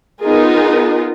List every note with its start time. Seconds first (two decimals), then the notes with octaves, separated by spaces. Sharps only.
0.21 B3 D#4 F4 G#4 A#4